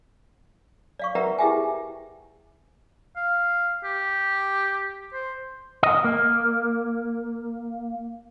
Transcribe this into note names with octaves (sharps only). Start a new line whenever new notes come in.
D5 F5 C#6
F#4 A#4 B4 E5 F#5 A#5
E4 G4 G#4 E5 G5 G#5
F5
G4
C5
D#5
A#3